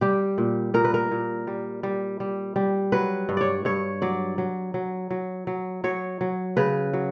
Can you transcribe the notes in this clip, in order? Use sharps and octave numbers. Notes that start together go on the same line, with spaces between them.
G3 G4
A#2
A#2 A#4
B4
A#4
A#2
G3
G3
G3
G3
F#3 B4
G2
C#5 D5
G2 C#5
F#3 D5
F#3
F#3
F#3
F#3
F#3 C#5
F#3
C#3 B4
F#3